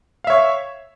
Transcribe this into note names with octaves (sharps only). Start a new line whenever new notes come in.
C#5 E5 F5